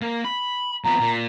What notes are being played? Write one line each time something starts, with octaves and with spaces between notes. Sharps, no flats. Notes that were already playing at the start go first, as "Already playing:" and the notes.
A#3
B5
F2 B3 A#5
A#2